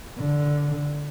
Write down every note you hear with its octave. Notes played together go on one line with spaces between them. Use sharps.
D3